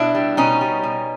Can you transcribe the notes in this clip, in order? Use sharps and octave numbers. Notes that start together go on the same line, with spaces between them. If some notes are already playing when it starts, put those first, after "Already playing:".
Already playing: B2 D4 E4
G3
B2 C#4 D#4
G3
B2